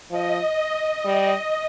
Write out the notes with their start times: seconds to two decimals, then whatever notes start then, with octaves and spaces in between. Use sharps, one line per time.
0.11 F3 D#5
1.05 G3 D#5